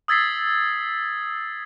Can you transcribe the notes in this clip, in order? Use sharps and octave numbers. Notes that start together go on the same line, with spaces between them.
D#6 E6 G#6 A6 B6 C7